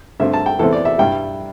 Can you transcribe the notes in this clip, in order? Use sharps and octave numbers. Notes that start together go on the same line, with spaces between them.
G2 D3 A3 C4 E5
A5
G5
E2 E3 A3 C4 E4 A4
D5
E5
G2 G3 E4 G5